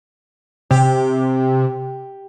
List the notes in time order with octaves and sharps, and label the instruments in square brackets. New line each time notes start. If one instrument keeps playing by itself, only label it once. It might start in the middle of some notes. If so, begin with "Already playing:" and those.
[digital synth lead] C3 [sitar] G4